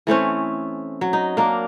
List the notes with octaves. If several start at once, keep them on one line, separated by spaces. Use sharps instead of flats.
E3 A3 C4 C#4
F#3
D#4
A#3 D4 A#4